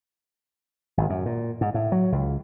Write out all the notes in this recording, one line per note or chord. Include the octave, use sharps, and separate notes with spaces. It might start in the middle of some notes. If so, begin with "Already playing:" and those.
G#1
F#2
A#2
G#2
A2
F#3
C#2